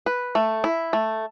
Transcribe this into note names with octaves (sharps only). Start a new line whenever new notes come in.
B4
A3
E4
A3